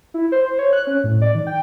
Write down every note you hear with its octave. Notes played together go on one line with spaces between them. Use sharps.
E4
C5
C5
C#5
F#6
C#4
A2
D5
D#3
G5